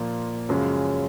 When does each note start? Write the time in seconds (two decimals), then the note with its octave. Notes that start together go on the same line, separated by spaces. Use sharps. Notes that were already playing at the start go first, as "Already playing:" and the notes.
Already playing: A#2 F3 A#3
0.49 F#2 C#3 F3 G#3